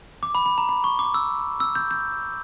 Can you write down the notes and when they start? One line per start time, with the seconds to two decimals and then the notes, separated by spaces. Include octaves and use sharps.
0.23 D6
0.35 B5
0.46 B5
0.58 A#5
0.69 B5
0.84 C#6
0.99 D6
1.14 E6
1.60 E6
1.75 G6
1.91 G6